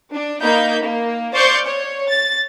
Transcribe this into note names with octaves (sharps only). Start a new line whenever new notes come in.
D4
A#3 D#4 B5 G6
A#3
C5 D5 F5 C6 C#6 G6
C#5
A6